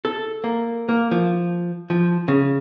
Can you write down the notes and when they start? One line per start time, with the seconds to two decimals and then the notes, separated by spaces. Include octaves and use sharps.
0.05 A4
0.44 A#3
0.89 A#3
1.11 F3
1.90 F3
2.28 C#3